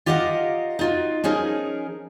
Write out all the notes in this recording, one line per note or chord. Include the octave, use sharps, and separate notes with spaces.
F4 G4 A#4 D#5 F5 F#5
D#4 F4 F#4
F3 C#4 D#4 G#4 A#4